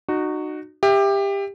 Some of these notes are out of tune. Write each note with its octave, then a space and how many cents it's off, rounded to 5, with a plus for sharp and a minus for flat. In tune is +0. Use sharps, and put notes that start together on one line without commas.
D#4 -30 F#4 +0
G4 +20 E5 +0